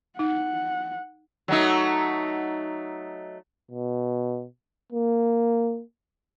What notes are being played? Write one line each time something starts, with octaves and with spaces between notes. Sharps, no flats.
D#4 F#5
F#3 A3 D#4
B2
A#3